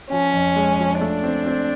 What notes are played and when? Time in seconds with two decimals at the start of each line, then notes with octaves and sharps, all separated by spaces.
0.11 F3 C#4
0.33 F2
0.56 G#3
0.79 F3
1.01 A3 D4
1.23 C4
1.46 C4